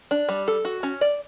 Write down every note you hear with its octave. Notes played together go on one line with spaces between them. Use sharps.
D4
G3
A4
F#4
C#4
D5